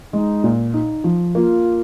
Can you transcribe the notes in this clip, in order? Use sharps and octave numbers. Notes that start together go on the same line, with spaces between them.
G#3 D#4
A#2
D#4
F3
A#3 F4